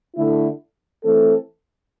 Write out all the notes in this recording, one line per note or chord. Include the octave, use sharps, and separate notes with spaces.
D3 A3 E4
E3 A3 C4 A4